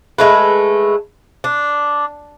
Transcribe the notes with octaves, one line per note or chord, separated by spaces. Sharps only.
G#3 A3 B4
D4